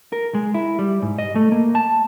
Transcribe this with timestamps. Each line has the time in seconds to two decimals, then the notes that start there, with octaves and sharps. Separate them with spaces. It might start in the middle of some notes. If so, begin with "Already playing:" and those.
0.12 A#4
0.35 G#3
0.54 E4
0.79 G3
1.02 G#2
1.19 D#5
1.35 A3
1.52 A#3
1.75 A5